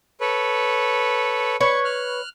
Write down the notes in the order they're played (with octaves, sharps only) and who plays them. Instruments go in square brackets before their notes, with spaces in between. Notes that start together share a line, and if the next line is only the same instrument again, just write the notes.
[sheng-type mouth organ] A4 B4 C#5
[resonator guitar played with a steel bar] B4 C#5 [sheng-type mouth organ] C#6
[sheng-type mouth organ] F6 F#6